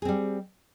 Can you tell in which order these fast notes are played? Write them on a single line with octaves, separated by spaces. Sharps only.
G#4 C4 G3